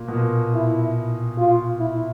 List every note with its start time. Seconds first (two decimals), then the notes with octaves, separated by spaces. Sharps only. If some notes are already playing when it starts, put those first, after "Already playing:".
Already playing: A#2
0.08 B2
0.13 A#2
0.54 E4
1.38 F4
1.80 E4